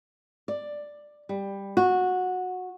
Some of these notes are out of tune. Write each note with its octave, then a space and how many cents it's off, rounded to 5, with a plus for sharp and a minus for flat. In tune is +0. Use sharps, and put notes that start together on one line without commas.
D5 +10
G3 +10
F#4 -15